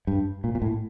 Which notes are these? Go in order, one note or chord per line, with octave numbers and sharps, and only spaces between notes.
G2
A#2
A#2
A2